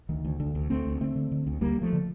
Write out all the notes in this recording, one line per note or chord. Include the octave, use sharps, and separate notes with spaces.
D2 D#3
D2
D2 D3
D2
D2 A3 C4
D2
D3 A3 C4
D3
D3
D2
D2 G3 A#3
D2
F3 A3
D3